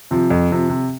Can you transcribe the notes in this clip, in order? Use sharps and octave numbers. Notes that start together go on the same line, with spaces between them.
C3 F3
F2
C3 F3
C3